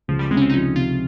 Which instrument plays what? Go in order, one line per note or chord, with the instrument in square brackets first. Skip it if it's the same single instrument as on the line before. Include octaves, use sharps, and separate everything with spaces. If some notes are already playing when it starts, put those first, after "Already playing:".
[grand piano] C#2 [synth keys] F3
[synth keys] G3
[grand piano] C3 [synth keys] G#3
[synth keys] C#4
C4
D#4
[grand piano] F3 [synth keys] C#4
[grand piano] C3 [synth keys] F4